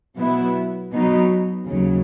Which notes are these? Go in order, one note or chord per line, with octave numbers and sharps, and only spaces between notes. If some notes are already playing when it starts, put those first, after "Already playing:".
B2 F#3 B3 E4
B2 F#3 B3 D#4
D#2 C#3 F#3